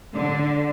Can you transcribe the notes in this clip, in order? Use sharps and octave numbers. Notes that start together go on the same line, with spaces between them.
D3